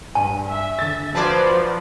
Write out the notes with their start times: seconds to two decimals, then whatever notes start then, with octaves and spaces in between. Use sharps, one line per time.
0.15 G2 G#5
0.48 E5
0.79 D3 A6
1.15 F3 F#3 F#4 B4 C5 D5 A5 G#6